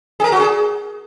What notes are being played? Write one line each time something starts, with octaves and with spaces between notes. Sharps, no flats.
G#4
A#4
F#4
G#4